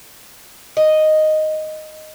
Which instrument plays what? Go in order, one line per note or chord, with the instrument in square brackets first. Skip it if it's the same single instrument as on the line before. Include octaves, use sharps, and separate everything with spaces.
[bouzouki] D#5